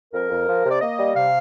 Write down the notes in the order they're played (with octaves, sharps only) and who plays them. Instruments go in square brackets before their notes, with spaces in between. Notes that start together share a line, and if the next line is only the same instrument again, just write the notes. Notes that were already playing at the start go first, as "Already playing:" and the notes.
[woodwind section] F2 A#4
F2
F3
C3
D5
A#3 D#5
G3
C3 F5